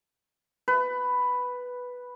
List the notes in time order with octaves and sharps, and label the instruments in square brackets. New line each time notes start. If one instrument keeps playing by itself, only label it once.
[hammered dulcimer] B4